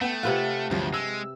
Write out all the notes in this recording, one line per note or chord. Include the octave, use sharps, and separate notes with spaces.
A3 B3 G5
C3 F4 B4 F#5
G1 D2 F3 F#3
G#3 E6